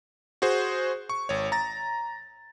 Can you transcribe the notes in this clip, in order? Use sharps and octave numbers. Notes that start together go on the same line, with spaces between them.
F#4 G#4 C5
C#6
G#1 C#5
A#5 A6